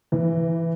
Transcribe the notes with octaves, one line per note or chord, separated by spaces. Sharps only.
E3